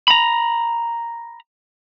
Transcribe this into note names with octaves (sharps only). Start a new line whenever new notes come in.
A#5 B5